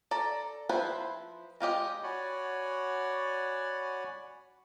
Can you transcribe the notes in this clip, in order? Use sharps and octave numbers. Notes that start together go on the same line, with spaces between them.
A4 D5 A#5
F3 E4 B4 C5 B5
G#3 F4 G4 D#5
F#4 C#5 D5 F#5 G#5 B5